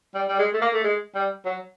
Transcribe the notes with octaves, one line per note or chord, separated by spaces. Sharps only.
G3
G3
G#3
A3
A#3
A3
G#3
G3
F#3